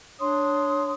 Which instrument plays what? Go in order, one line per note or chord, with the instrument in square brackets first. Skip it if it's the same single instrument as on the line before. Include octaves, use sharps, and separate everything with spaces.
[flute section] D4 C#5 C6 D#6